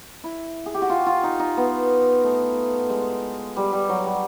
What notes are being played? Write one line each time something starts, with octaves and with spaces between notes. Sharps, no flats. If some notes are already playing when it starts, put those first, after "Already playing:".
E4
G#4
G4
F#4
F4
F4
D#4
D#4
B3
A3
G#3
G3
G3
F#3
G3